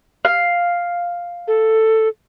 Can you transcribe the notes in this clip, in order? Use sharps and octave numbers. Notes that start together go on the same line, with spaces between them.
F5
A4